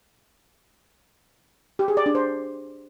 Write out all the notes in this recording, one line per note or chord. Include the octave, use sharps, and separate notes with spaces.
G4
G#4
D5
D4
C5